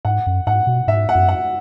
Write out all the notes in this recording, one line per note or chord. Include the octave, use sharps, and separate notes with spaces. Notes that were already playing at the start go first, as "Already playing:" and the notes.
G#2 F#5
F#2
G#2 F#5
B2
G#2 E5
F#5
F#2
F#5